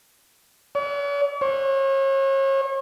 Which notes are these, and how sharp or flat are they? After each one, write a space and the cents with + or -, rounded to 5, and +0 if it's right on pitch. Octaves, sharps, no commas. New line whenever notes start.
C#5 +45
C#5 -40